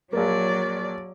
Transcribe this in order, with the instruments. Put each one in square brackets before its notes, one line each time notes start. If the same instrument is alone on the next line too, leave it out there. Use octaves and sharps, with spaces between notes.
[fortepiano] A#1 A#3 [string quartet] F#3 D5